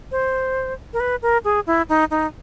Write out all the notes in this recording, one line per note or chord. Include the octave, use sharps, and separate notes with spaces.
C5
A#4
B4
A#4
G#4
E4
D#4
D#4